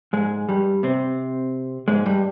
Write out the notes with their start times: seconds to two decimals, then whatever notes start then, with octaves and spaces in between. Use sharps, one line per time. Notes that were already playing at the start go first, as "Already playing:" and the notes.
0.13 G#2 G#3
0.49 G2 G3
0.83 C3 C4
1.88 G#2 G#3
2.06 G2 G3